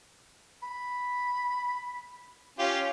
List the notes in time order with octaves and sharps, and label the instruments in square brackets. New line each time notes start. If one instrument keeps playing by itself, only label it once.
[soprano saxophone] B5
[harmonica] C#4 F4 G4